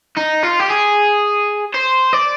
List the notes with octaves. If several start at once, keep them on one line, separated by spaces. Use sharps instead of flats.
D#4
F4
G4
G#4
C5
D5